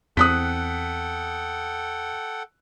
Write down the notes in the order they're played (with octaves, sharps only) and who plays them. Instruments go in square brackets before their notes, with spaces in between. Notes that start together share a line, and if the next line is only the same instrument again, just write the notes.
[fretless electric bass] E2 C4 [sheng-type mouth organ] A4 F#5 G5 [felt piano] D#6 F#6 B6